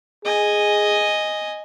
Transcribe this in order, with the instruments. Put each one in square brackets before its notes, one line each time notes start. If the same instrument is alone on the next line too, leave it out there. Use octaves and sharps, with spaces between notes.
[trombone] G#4 [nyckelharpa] D#5 G#5